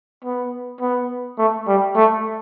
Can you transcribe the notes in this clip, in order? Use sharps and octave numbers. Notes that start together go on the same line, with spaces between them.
B3
B3
A3
G3
A3